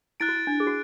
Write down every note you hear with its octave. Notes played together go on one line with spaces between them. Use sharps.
E4 F#6 A6 D7
F#4
E4
D4
G#4
F#4